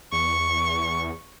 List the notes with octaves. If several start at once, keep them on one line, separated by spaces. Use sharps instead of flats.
E2 C#6